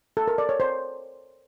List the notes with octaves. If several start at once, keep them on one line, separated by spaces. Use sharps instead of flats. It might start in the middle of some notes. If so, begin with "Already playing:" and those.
A4
A#4
D5
C#5
C5